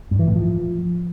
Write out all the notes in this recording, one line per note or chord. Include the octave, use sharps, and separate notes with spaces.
G2
E3
A2
F3